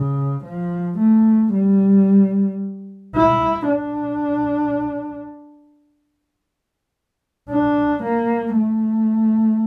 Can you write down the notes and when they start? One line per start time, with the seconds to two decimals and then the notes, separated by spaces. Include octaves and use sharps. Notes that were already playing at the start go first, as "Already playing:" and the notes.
Already playing: C#3
0.45 F3
0.99 A3
1.53 G3
3.16 E4
3.69 D4
7.50 D4
8.03 A#3
8.57 A3